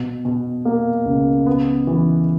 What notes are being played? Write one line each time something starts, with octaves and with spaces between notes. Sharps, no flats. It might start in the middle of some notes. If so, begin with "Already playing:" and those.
Already playing: B2
B2
A#3
C#2
B3
E3